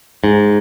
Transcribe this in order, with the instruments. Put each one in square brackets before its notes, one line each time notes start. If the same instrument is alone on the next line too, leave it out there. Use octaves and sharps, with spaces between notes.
[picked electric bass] G#2